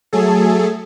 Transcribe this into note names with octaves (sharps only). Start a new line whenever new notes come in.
F#3 A3 G#4 A4